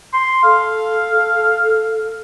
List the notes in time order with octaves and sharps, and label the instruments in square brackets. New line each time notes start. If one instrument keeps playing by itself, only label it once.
[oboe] C6
[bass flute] A4 [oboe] F5